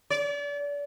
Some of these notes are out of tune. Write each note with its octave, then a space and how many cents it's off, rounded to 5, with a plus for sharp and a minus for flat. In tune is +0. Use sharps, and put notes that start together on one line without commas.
D5 -35